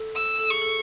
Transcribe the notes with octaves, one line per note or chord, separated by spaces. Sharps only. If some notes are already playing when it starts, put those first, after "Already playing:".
Already playing: A4
E6
A4
G#4 C#6
A4